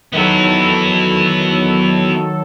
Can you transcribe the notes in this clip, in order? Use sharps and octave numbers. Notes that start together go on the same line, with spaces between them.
D#3 F#3 B3 E4 A4